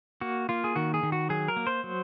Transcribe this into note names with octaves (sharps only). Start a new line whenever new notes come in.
A#3 F#4
A#3 F4
G#4
D#3 F#4
G#4
D#3
F#4
F#3 G#4
A#4
A#3
C5
F#3